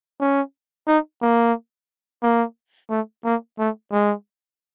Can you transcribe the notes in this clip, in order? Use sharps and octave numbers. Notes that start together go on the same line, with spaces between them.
C#4
D#4
A#3
A#3
A3
A#3
A3
G#3